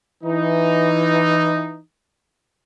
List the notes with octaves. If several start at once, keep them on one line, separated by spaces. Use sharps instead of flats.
E3 D#4